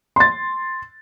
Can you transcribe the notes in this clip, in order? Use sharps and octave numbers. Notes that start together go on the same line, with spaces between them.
C6 A6